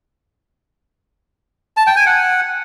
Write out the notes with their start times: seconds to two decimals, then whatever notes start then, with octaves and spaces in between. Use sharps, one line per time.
1.77 A5
1.87 G5
1.96 G#5
2.06 F#5